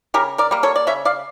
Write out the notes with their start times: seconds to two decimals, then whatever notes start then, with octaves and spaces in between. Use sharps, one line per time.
0.14 C#3 G4 A#4
0.38 A#4 D5
0.51 G3 A#3
0.63 A4 C#5
0.76 D5
0.87 C#3 C#5 E5
1.05 D5 F5